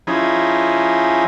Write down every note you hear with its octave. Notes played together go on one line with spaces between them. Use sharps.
F3 C#4 D#4 E4 G#4